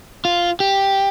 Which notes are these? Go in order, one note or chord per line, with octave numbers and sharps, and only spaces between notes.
F4
G4